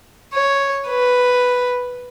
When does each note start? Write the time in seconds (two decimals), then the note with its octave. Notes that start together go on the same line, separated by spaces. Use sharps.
0.34 C#5
0.89 B4